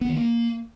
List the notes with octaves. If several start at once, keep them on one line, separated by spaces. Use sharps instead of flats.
B3
D#3
A#3